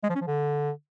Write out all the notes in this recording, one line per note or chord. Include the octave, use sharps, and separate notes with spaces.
G#3
F3
C#4
F3
D3